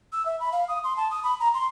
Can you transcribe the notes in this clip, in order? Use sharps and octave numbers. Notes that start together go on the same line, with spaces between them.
E6
E5
B5
F5
D#6
C6
A5
D#6
B5
A#5
C6